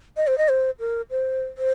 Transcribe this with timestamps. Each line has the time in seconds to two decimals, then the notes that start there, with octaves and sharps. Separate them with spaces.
0.17 D#5
0.27 C5
0.38 D#5
0.49 C5
0.80 A#4
1.11 C5
1.58 C5